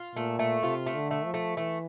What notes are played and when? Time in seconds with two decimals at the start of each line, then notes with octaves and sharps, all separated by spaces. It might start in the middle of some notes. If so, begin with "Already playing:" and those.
Already playing: F4
0.15 A#2 A3
0.39 A3
0.63 C3 F4
0.86 A3
0.95 D3
1.11 A3
1.26 F3
1.34 A3
1.57 E3 A3